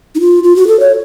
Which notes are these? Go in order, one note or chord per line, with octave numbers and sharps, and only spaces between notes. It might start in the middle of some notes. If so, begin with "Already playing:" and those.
D#4
F4
F4
F#4
A4
C#5